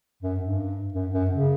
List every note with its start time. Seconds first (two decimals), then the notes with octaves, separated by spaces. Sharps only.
0.22 F#2
0.40 G2
0.94 F#2
1.12 F#2
1.31 C#3